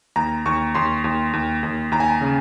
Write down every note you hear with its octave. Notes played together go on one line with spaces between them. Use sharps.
D#2 A#5
D#2 C#6
D#2 C6
D#2
D#2
D#2
D#2 A#5
G#5
A#5
C#3